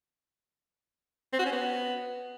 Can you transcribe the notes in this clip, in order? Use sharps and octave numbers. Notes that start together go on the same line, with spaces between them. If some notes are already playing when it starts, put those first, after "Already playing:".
C4
F#4
C#4
B3